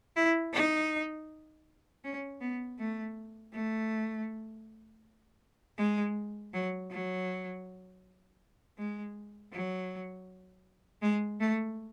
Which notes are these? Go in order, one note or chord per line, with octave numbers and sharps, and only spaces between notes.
E4
D#4
C#4
B3
A3
A3
G#3
F#3
F#3
G#3
F#3
G#3
A3